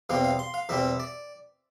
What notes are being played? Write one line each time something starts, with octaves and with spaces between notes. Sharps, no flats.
E2 B2 G3 C4 F5
F5
C6
F5
E2 B2 G3 C4 E5
D5